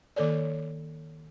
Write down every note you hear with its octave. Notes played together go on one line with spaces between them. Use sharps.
D#3 A#3 A4 C#5 D5